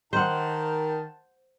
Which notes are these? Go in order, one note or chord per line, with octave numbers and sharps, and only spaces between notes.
D#3 C5 F#5 A5